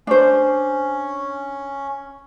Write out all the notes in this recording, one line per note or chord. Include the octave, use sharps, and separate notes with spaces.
C#4 D4 C5